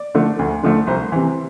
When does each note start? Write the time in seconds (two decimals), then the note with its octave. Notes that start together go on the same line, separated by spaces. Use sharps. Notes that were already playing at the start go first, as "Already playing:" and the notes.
Already playing: D5
0.14 D3 F3 A3
0.39 D2
0.63 D3 F3 A3
0.87 C2 C5
1.12 C3 E3